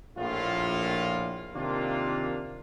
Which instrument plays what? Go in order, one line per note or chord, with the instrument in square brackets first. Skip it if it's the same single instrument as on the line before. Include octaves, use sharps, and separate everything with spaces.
[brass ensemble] A#1 A2 F4
C3 D#3 A#3 D4 F4